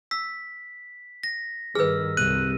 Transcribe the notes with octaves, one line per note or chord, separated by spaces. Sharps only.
E6 B6
A#6
G2 D#3 G#4 B4 E6 F6
C2 C3 F#6 D#7